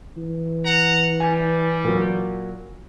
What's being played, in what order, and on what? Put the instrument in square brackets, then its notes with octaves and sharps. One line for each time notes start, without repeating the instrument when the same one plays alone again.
[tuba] E3
[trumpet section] F#5 A#5
[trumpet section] G3 [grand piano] G#5
[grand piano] A#2 F#3